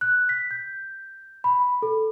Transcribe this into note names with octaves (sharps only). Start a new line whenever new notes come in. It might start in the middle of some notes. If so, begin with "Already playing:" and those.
F#6
B6
G6
B5
A4